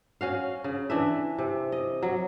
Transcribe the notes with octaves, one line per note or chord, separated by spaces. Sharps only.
C#4 F#4 F5
C#3
E3 D4 E5
C3
D#5
F#3